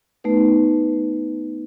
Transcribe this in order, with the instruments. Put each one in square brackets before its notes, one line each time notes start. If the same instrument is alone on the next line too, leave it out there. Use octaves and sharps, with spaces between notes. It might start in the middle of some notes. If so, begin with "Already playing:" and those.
[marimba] A3 B3 D#4 B4